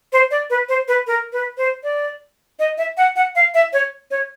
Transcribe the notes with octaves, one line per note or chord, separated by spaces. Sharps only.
C5
D5
B4
C5
B4
A#4
B4
C5
D5
D#5
E5
F#5
F#5
F5
E5
C#5
C#5